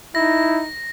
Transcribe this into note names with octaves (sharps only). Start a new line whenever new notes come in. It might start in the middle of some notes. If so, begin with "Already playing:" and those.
D#4 E4 A#6